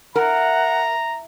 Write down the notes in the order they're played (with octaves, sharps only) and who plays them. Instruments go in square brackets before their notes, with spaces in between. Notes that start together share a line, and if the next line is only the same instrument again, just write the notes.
[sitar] E4 [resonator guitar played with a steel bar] A#4 [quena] F#5 [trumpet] A#5